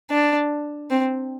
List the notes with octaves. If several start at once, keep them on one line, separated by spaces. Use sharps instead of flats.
D4
C4